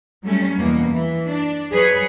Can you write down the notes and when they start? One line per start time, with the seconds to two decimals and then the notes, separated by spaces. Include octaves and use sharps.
0.24 F#3 G3 A3 C#4
0.57 E2 B2 A#3
0.91 E3
1.27 D4
1.73 F#3 G#4 B4 C#5